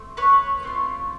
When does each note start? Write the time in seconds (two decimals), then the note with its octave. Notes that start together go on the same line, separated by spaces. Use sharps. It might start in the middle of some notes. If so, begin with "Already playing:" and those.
Already playing: A3 C4
0.17 B4 C#5
0.63 A3 C4 F4